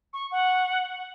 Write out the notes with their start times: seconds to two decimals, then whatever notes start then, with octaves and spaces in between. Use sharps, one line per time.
0.13 C#6
0.31 F#5